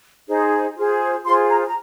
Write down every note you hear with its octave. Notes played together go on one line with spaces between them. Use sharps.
D#4 G#4 C5
F4 G#4 C5
F4 G#4 C5 C6
A#5
A#5